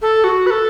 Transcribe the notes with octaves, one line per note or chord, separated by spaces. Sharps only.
A4
F#4
B4
A4